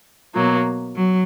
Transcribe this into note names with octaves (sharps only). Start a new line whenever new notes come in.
B2 F#3 A#3
F#3